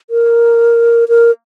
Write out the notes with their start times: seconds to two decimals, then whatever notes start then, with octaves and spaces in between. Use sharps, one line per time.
0.10 A#4
1.09 A#4